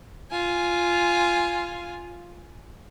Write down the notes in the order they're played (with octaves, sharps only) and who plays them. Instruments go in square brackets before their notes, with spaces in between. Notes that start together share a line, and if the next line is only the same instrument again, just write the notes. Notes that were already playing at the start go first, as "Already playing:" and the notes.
[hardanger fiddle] F4 G#5